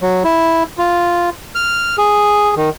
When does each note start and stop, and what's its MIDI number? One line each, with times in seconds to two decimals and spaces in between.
0.01 0.23 54
0.24 0.63 64
0.78 1.30 65
1.55 1.96 89
1.98 2.55 68
2.57 2.70 51